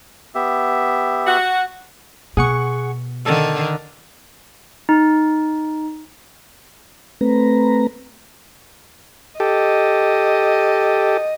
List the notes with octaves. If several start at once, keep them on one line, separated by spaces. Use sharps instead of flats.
B3 G4 E5
F#4 F#5
B2 G#4 F#5 C#6
D3 D#3 A4
D#4
A3 C4 B4 A#5
G4 A4 D#5